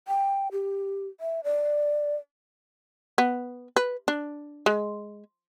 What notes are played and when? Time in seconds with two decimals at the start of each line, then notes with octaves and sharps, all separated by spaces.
0.08 G5
0.52 G4
1.20 E5
1.44 D5
3.18 B3
3.76 B4
4.08 D4
4.66 G#3